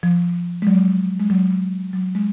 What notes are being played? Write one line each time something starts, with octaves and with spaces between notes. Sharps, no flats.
F3
G#3
F#3
G#3
F#3
F#3
G#3